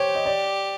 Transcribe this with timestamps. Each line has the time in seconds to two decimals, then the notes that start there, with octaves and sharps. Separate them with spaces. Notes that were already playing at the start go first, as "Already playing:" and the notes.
Already playing: G4 C5 C#5
0.15 D#5
0.26 D5